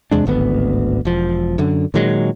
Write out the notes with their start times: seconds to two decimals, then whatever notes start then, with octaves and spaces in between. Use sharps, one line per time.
0.11 E2 C3 G#3 D4
0.26 D1 G#1 D2 B3
1.05 E1 F3
1.58 F#2 D3
1.94 A#2 D#3 F#3 G#3